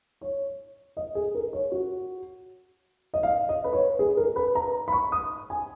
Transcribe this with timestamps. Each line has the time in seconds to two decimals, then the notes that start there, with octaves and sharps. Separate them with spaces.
0.21 C#5
0.97 D#5
1.15 G#4
1.35 A#4
1.53 C#5
1.72 F#4
3.14 D#5
3.23 F5
3.49 D#5
3.64 B4
3.73 C#5
3.99 G#4
4.17 A#4
4.36 B4
4.55 A#5
4.88 B5
4.92 C#6
5.12 D#6
5.50 G#5